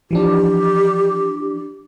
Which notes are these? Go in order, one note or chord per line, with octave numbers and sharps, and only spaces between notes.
E3 F3 D4 G4